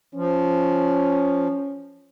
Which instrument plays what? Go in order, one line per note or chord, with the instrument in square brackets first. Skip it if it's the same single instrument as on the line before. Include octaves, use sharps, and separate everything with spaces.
[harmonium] F3 [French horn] C#4